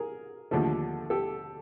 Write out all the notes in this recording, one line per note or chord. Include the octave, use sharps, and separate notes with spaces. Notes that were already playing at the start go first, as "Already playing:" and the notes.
Already playing: G#4 A#4
D#2 D3 F3 A3
G4 A4